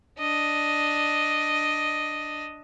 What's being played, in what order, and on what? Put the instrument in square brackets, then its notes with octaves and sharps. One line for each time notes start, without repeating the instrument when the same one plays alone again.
[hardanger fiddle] D4 D#5